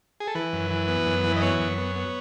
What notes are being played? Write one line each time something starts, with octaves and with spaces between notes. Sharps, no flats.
G#4
A4
E3 B4
F#2
E3
B3
F#2
E3
D#5
B3 C#5
F#2
B3
B3